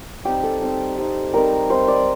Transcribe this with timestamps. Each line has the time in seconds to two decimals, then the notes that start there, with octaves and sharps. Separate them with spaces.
0.25 G3 C4 D#4 G4
0.43 A4
0.61 G3 C4 D#4
0.98 G3 C4 D#4
1.33 G3 C4 D#4 A#4
1.70 G3 C4 D#4 C5
1.88 D5